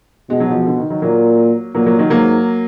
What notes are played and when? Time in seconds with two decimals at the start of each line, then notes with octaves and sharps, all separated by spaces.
0.30 B2 G#3
0.40 F#3
0.50 F3 G#3
0.66 D3
0.78 D#3
0.90 D#3 F#3
1.02 A#2 F#3 A#3
1.75 A#2 F#3 A#3
1.86 F#3 A#3
1.98 D#3 F#3
2.10 G#2 F#3 A#3